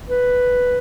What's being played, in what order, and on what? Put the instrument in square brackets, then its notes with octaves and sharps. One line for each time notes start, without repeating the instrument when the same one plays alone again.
[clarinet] B4